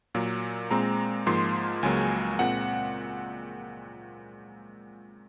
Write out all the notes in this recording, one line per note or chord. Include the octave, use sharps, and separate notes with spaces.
A#2 F#3 A#3
A#2 G#3 C4 A#5
G#2 F3 A#3 C6
C#2 C#3 F#3 A#3 G#5
A#2 G#3 C4 F#5